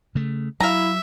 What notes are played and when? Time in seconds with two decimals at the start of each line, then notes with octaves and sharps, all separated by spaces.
0.15 C#3 A3
0.60 F#3 E4 E5 F5 A#5